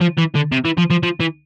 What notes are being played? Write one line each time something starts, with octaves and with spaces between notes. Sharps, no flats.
F3
E3
D3
C3
E3
F3
F3
F3
E3